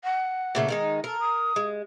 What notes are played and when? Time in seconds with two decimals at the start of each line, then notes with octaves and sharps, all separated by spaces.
0.04 F#5
0.55 A#2 C#3 A3
0.69 D#3 G#3 D#4
1.04 A4 A#4
1.20 D#6
1.56 G#3